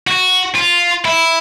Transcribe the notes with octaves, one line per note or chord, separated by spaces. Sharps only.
F#4
F4
E4